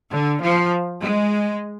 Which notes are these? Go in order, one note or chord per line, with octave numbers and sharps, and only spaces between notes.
D3
F3
G#3